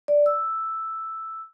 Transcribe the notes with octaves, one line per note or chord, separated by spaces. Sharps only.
D5
E6